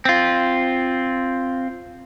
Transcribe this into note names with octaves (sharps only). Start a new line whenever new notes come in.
C4 F4